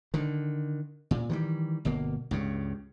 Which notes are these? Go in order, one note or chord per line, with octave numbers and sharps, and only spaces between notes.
D3 D#3
A#2
D#3 E3 F#3 G3
G1 B2 A#3
C#2 G2 C#3